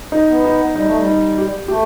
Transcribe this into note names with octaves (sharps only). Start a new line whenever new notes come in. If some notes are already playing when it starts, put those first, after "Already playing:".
D#4
B3
D#4
G3 D#4
A3
G3
D#4
G4
A3 G4